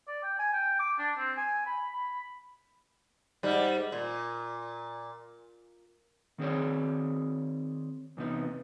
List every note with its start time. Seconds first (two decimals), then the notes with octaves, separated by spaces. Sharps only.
0.08 D5
0.23 G5
0.39 G#5
0.54 G5
0.79 D6
0.99 D4
1.18 C4
1.37 G#5
1.66 B5
1.93 B5
3.43 G#2 G3
3.92 A#2
6.38 D#3 C4 G#4 C#5 D5
8.17 E2 C3 B3 D#4